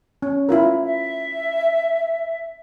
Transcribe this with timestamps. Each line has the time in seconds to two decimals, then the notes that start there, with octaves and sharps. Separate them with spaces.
0.22 C#4
0.49 E4 F4 A#4
0.84 E5